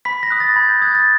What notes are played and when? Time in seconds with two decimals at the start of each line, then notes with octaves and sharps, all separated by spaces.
0.05 B5 B6
0.23 A#6
0.30 D#6 F#6
0.40 A6
0.56 B5 G#6
0.69 G6
0.82 D#6 F#6 G#6
0.95 A6